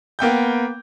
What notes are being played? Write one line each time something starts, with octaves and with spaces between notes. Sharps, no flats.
A#3 B3 G5 G6